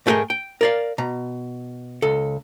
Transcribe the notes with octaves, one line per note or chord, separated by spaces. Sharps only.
G#2 A3 E4 G#4 A#4 G5
G5
A#4 D5 F5
B2 A#5
C#2 A4